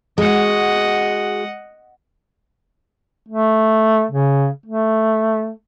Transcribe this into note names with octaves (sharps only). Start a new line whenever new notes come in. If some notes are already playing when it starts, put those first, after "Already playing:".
G#3 F#4 D#5 F#5
A3
C#3
A3